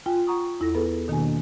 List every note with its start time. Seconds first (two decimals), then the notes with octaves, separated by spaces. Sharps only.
0.06 F4 G5 G#5
0.27 F#5 A#5 C#6 D#6
0.60 E2 E4 A4 A#6
0.75 B3 G#4 A4 B4
1.08 B2 D#3 A#3 D4 F#4 G#5